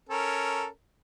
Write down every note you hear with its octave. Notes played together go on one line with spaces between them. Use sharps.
C#4 A4 A#4